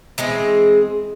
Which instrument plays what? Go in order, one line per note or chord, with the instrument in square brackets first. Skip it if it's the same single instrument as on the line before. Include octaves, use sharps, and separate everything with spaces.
[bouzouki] E3 G#3 C4 G#4